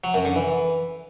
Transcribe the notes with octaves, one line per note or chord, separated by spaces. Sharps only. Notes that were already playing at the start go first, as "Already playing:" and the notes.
F#3
F#2
D3
E3